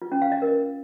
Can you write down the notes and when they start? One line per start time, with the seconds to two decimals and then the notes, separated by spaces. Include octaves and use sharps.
0.02 F4
0.12 C#4
0.22 F5
0.32 D#5
0.42 A#4